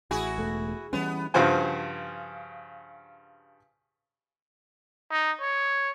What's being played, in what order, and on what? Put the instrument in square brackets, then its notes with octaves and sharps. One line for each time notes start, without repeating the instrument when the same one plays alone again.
[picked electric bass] A1 [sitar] E4 F#4 G#4
[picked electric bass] E1 A3
[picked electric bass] E3 G3 C#4 [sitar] B3
[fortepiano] G2 C#3 F3 F#4 C5 G#5
[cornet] D#4
C#5